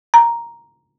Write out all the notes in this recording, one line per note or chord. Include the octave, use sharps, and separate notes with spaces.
A#5